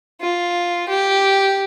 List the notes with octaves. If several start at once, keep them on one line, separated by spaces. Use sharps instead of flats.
F4
G4